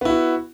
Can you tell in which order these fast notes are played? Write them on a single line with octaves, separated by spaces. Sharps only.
B3 E4 F#4